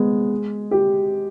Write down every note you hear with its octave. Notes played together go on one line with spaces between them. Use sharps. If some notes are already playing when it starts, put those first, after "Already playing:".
Already playing: G#3 B3
G4